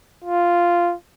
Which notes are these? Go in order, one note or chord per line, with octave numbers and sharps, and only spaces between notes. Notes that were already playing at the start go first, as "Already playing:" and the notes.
F4